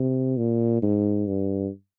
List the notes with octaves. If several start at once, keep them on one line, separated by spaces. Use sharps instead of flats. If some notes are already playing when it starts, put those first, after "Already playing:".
Already playing: C3
A#2
G#2
G2